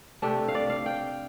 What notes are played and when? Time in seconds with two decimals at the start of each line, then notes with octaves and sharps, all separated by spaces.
0.22 C3 A3 D4 G4
0.48 F5
0.55 D5
0.70 F5
0.86 G5